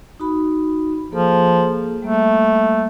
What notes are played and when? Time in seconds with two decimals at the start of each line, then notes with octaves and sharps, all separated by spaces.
0.20 D#4 F#4 B5
1.12 F3 A#3 G#4 A4
2.02 G3 A3 A#3